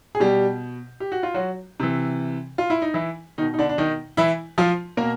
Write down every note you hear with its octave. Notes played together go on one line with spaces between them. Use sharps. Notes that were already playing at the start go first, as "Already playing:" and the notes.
G#4
B2 G3 G4
G4
F#4
F4
F#3 F#4
C3 E3
F4
E4
D#4
E3 E4
B2 D#3 D#4
D#4
D3 D4
D4
D#3 D#4
E3 E4
F3 F4
B2 A#3 A#4